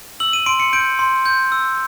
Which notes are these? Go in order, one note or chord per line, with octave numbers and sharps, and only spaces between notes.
E6 F#7
D#7
C6 D7
C#7
G6 D7
C6
G6
E6